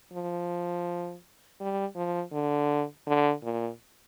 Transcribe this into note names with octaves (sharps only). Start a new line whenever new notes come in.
F3
G3
F3
D3
D3
A#2